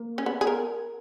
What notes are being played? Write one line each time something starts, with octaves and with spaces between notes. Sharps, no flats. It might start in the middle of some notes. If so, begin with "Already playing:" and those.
Already playing: A#3
C#4
B3
G#4
A#4